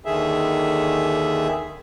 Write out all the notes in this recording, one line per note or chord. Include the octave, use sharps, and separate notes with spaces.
D#2 D3 D#3 G#4 E5